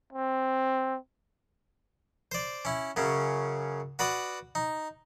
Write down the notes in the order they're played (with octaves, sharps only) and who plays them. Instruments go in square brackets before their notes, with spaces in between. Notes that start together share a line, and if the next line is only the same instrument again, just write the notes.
[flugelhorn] C4
[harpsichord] C5 D5
C#4 E4
F#2 C#3 C#4
F#4 B4 D5 B5 D#6
D#4